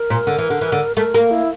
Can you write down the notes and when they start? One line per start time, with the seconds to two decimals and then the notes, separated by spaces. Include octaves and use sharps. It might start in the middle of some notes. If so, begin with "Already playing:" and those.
Already playing: A#4
0.10 A#2
0.27 D3
0.38 E3
0.50 D3
0.61 E3
0.72 D3
0.97 A3 A#4
1.14 A#3
1.31 E4